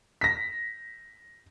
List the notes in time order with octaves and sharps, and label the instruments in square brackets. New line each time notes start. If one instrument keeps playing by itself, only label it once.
[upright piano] A#6 B6